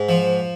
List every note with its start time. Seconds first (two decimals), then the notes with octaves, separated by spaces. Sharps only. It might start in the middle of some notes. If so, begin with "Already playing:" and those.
Already playing: G#2
0.09 F3